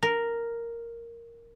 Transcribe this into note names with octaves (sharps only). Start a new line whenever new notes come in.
A#4